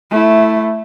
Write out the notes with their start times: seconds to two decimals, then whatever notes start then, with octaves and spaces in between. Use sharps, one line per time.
0.10 A3 E4